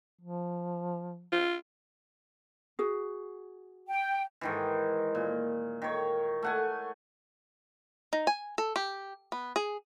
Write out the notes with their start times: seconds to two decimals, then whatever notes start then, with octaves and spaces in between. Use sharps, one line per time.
0.21 F3
1.32 F4
2.79 F#4 G#4
3.89 G5
4.41 G#2 D#3 E3
5.15 A#2
5.82 D#3 C#5
6.43 A3 F#5 G#5
8.13 D#4
8.27 G#5
8.58 A4
8.76 G4
9.32 B3
9.56 G#4